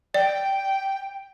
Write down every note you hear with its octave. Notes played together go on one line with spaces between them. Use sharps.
D5 G5